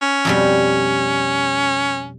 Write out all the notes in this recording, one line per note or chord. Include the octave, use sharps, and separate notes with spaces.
C#4
F2 B2 G3